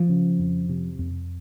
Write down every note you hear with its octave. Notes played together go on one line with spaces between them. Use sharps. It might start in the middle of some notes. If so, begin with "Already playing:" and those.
Already playing: F3
C#3
F2
C3
F2